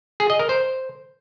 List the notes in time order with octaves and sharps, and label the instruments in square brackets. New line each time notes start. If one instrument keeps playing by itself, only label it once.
[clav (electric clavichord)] G#4
D#5
A#4
C5